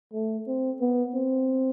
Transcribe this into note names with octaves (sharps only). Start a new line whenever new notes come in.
A3
C4
B3
C4